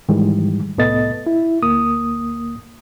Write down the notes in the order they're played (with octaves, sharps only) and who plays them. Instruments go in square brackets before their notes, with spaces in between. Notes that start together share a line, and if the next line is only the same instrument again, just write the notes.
[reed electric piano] G#2 D#3 E3 G3 G#3
C2 A2 B3 A4 D#5 A6
E4
D2 A#3 D#6